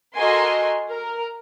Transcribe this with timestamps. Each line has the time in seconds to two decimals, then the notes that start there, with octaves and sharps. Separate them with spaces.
0.17 F#4 A4 A#4 D#5 G#5 C6
0.89 A#4